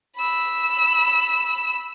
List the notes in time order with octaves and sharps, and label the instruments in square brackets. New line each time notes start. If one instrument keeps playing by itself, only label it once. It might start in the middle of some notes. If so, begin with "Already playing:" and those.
[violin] B5 E6